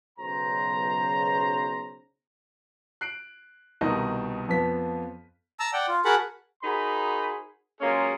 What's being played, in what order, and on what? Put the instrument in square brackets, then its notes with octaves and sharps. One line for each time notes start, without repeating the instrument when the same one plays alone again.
[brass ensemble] B1 C#3 C5 A#5
[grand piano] F#6 C7 D7
C2 B2 D#3 D#5 A5
F2 F3 B3 B6
[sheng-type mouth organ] A5 A#5 E6
D5 F#5 G5
F4
F#4 G#4 A#4 F#5 A5 B5
[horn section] D#4 F#4 G#4 A#4 C5 B5
F#3 G#3 A#3 C#4 F4 G#4